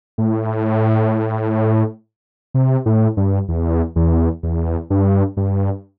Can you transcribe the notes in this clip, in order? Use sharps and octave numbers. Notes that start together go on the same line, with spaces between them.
A2
C3
A2
G2
E2
E2
E2
G2
G2